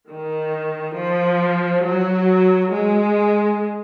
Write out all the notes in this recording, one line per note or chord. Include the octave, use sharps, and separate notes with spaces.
D#3
F3
F#3
G#3